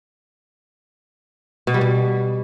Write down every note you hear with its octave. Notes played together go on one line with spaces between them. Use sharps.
B2
G3
B2